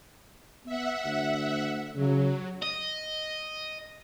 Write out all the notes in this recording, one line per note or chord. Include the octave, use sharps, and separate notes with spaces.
B3 E5 F#5
D2
C#3 F#3
D#5